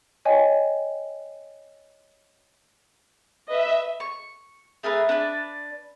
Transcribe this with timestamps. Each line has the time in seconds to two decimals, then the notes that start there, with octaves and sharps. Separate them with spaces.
0.25 C#5 D#5 G5 G#5
3.48 B4 D#5 E5
4.00 C#6
4.83 A3 G#4 A#4 B4
5.09 D4 B4 D5